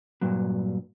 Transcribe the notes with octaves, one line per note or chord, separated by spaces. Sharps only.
G2 A#2 F#3